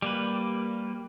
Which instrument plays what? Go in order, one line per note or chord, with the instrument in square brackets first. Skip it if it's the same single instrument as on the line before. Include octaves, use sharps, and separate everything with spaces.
[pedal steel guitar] G3 A#3 B4